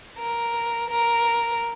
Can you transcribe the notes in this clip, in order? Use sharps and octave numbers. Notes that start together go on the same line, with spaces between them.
A#4
A#4